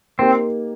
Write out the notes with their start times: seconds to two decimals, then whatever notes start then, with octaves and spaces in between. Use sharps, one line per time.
0.19 A#3 C4 D#4 G4 A#4